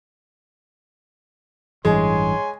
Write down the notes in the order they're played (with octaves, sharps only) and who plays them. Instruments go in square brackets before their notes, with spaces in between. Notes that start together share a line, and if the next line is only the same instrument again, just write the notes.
[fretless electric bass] A1 G2 E3 [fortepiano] G#3 [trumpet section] C#5 G#5 C6